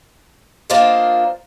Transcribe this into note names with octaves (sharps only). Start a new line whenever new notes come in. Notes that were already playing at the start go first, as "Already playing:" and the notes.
A#3 D4 F4 A#4 C5 D#5